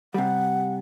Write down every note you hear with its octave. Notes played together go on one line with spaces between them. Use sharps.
C3 G3 F#5